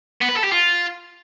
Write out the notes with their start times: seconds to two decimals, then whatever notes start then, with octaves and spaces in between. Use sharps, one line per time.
0.21 B3
0.29 B4
0.36 A4
0.44 G4
0.51 F4